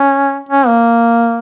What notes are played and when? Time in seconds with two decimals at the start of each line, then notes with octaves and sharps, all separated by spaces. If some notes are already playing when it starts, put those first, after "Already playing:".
Already playing: C#4
0.49 C#4
0.67 A#3